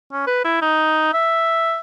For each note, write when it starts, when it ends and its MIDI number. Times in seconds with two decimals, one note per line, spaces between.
0.12 0.23 61
0.27 0.44 71
0.44 0.61 64
0.62 1.08 63
1.13 1.80 76